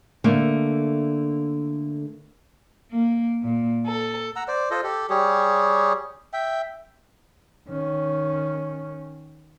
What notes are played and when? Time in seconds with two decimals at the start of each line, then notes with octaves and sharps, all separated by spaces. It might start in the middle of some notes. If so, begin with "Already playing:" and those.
0.24 D3 A3 A#3
2.91 A#3
3.43 A#2
3.86 A4
4.36 F#5 A#5 E6
4.48 C5 D5
4.71 F4 A4 C5 D#5
4.84 G4 A4
5.10 G3 G4 G#4 C#5
6.33 E5 G5
7.69 D#3 C#4